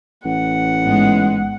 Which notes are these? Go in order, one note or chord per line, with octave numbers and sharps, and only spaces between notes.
A1 F#5
G#2 G#3 B3